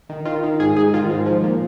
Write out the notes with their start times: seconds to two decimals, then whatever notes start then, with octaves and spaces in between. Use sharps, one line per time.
0.09 D#3
0.25 D#3 F4
0.43 D#3
0.60 G#2 G#4
0.76 G#2 G#4
0.94 D#3 F4
1.10 G#2
1.26 F3
1.44 A#2